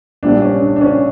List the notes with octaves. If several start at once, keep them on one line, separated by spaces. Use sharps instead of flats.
A#1 A#2 G3 D4
C#4
D4
D4
C#4